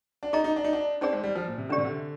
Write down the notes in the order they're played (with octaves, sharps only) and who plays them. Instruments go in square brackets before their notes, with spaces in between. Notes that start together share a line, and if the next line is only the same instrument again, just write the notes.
[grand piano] D4
[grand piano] D#4 [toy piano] G#4 D#5 A#5
[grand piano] D#4
D4
D#4
D4
[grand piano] C4 [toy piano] D#4 G#4 D5
[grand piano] G#3
G3
F3
A#2
C3
[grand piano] D3 [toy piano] D4 G4 D5
[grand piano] C3
D3